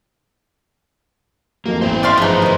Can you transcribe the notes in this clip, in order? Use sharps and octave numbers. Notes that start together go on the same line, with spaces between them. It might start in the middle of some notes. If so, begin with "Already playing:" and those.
F2 D#3 F#3 A#3
A1 B3 C5
G2 A3 D5 E5 F5 C6
G#2 F3 B3 D#4
D#3 F4 C5 D#5